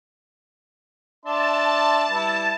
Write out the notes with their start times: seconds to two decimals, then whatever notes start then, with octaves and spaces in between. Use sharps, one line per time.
1.25 D4 E5 A5 C6
2.11 G3 E4 B4